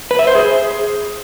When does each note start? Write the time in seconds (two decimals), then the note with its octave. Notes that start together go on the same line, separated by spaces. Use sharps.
0.11 B4
0.19 E5
0.27 C5
0.35 G#4